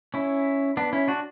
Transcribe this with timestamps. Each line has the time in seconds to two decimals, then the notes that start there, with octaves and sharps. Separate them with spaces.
0.14 C#4 E4
0.77 B3 D4
0.93 C#4 E4
1.08 D4 F#4